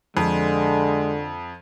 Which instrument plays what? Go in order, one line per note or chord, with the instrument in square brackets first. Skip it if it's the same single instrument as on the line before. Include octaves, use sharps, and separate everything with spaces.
[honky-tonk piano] F2 [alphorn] D3 [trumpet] G#3